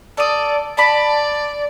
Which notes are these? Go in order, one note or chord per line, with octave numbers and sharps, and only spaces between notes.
A4 D5 D#6
D5 A5 B5